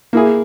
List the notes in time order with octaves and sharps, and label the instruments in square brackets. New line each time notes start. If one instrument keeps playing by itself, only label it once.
[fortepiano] A#3 E4 G#4